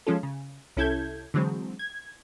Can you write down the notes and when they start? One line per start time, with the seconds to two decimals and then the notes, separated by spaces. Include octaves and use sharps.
0.07 F3 G#3 C#4 F4 A4
0.23 C#3
0.77 C2 C#4 E4 A4 G6 G#6
1.34 D3 E3 F#3 G#3 C4
1.79 G#6